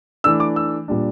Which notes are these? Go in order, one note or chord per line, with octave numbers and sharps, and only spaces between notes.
E3 A3 D4 E6
D6
E6
A#2 G3 D4